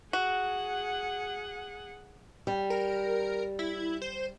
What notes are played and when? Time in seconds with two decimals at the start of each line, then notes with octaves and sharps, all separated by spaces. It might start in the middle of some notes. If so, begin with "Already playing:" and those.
0.13 F#4 G#4 F#5
2.47 G3
2.70 A#4
3.59 E4
4.02 C5